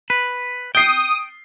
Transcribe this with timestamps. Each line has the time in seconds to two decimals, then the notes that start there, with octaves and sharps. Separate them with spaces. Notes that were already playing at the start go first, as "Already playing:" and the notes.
0.10 B4
0.75 G5 D#6 C7 G7